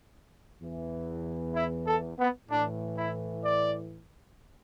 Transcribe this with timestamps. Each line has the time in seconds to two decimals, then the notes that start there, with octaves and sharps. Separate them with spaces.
0.61 E2 E3
1.55 E4
1.86 A4
2.18 B3
2.49 A2 E3 D4
2.96 E4
3.45 D5